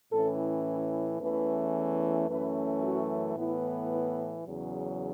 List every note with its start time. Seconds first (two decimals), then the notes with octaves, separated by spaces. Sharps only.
0.11 A2 E3 C#4 A4
1.19 E2 E3 A3 C#4 B4
2.27 F#2 E3 A3 C#4 B4
2.82 F#4
3.35 A2 E3 B3 E4
3.90 E4
4.44 E2 C#3 F#3